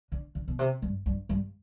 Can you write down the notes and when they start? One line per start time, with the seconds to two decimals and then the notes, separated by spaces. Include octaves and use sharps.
0.12 D3
0.35 D3
0.48 B2
0.59 C3
0.82 G2
1.06 G2
1.29 G2